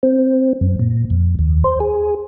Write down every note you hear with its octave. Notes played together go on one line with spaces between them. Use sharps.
C4
F#2
A#2
F2
D#2
C5
G#4